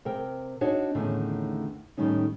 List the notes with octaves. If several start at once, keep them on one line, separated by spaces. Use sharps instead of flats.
C3 A#4 G5
D4 D#4 F#4 C#5
E2 A2 D3 D#3 C#4
A2 D#3 G3 C#4 D#4